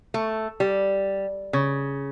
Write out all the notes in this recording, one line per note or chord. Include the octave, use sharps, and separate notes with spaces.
A3
G3
C#3